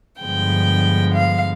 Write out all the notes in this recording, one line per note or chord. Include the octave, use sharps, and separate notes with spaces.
G2 D3 F3 G#3 B3 G5
F5